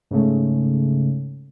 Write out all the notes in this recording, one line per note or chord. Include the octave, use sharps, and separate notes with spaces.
G#2 C#3 A3